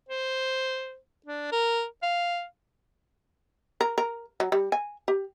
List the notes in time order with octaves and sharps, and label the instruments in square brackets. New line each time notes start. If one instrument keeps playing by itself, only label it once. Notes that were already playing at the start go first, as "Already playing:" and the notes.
[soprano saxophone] C5
D4
A#4
F5
[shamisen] A#4
A#4
F#3
G3
G#5
G4